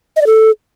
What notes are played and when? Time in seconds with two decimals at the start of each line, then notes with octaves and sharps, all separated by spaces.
0.16 D#5
0.21 D5
0.27 A4